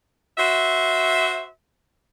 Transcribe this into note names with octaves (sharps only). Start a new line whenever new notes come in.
F#4 C5 E5